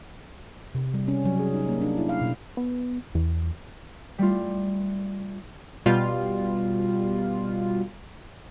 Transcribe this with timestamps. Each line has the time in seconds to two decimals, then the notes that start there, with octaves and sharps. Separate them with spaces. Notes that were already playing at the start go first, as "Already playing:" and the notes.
0.75 C3
0.94 G3
1.08 C#4
1.25 F#3
1.40 G#4
1.53 D#4
1.69 A#3
1.81 D4
1.98 E4
2.09 F5
2.21 B2
2.57 B3
3.15 E2
4.18 G3 A3 F4
5.86 B2 G3 F4